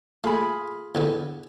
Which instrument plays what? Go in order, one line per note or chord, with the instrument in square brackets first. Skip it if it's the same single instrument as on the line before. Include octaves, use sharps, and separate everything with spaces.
[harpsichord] A3 [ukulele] F4 G#4 B5
[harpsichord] E2 D3 B3